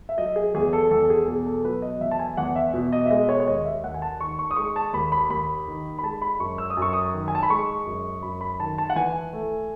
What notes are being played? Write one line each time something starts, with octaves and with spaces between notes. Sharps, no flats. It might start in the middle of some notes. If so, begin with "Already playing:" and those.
E5
F#3 D#5
G#4
E2 G#4
A4
E2 A4
G#4
B2 G#4
A4
F#3 B4
D#5
E2 E5
A5
G#5
E2 F#5
E5
B2
D#5
E5
G#3 D#5
C#5
C#5
D#2 D#5
E5
D#2 F#5
G#5
A5
D#3 C#6
C#6
D#6
G#3 C#6
A5
D#2 B5
B5
D#2 B5
D#3
B5
G#3 A5
B5
F#2 C#6
E6
D#6
F#2
C#6
D#6
D#3
G#5
A5
B5
G#3 C#6
F#2
F#2 B5
B5
D#3 A5
A5
F#5
E3 G#5
A3